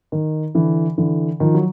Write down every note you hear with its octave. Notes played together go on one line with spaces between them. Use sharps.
D#3
D3 E3
D3 E3
D#3 F3
F#3